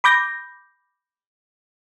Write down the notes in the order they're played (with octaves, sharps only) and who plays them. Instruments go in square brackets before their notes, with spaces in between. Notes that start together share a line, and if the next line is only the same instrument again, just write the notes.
[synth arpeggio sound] B5 D6 G6 A#6